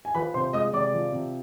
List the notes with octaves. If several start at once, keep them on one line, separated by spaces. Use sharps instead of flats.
G#5
F3 B4 B5
C3 C5 C6
G#3 D#5 D#6
C3 D5 D6
F3
C3